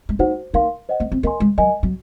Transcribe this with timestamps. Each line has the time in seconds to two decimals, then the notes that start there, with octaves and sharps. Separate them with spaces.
0.09 G#3
0.19 A#3 D#4 F#4 C5 F#5
0.53 A#3 D#4 A#4 F5 C6
0.89 C5 D#5 F#5
1.00 A#3
1.12 C4
1.23 A#3 A#4 D#5 G#5 C6
1.40 G#3
1.58 F#3 A#4 D#5 G#5
1.83 F#3